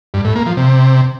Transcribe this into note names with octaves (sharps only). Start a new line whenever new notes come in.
G2
A2
A#3
F3
C3